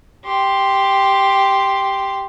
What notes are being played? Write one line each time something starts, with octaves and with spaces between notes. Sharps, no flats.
G4 C6